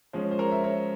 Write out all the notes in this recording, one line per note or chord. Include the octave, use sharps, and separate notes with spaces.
F3 G#3 C#4 C5
C5
A#4 C#5
E5
A#4 C#5